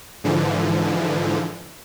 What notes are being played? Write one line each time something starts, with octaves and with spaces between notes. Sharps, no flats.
G#2 D3 E3 F3